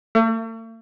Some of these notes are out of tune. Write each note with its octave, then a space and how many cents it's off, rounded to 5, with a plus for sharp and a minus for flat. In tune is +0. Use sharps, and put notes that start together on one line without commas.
A3 +45